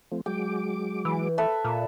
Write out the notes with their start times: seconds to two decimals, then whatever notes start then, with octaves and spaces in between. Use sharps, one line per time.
0.12 F3 A3 C4
0.26 F#3 G#3 G5 D6
1.05 E3
1.38 A4 B4 E5
1.64 A#2